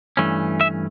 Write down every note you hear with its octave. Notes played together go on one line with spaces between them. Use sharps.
G2 E3 A3 C#4
E5